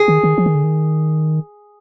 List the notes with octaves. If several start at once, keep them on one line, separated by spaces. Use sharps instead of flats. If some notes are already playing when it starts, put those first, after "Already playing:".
Already playing: G#4
D#3
D#3
F3
D#3
D3
D#3